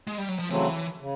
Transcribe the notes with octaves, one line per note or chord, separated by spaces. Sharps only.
G#3
G3
F#3
F3
C#3 E3 F#3 A3 C4
C#3